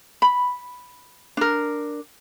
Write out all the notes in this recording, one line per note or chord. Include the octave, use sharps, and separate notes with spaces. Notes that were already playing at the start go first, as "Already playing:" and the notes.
B5
D4 A#4